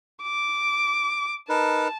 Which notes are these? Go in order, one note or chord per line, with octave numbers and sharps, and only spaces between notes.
D6
D#4 A#4 B4 A5